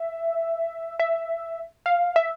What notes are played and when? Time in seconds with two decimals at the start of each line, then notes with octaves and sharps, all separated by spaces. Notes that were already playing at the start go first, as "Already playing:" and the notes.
Already playing: E5
0.99 E5
1.86 F5
2.16 E5